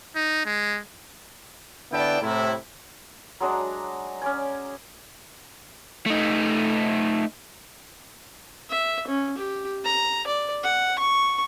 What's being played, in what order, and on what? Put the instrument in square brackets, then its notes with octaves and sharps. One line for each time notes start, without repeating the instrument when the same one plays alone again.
[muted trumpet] D#4
G#3
[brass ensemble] D3 B3 E4 D5 G5 A5
A2 C3 E4
[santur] F#3 G#3 D4 A#5
C#4 D5 G#5
[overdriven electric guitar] A3 D#4
[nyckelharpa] E5
C#4
G4
A#5
D5
F#5
C#6